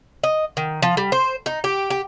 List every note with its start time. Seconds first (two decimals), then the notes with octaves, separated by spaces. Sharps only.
0.24 D#5
0.57 D#3
0.82 F3
0.97 G3
1.12 C5
1.46 D#4
1.64 G4
1.90 G4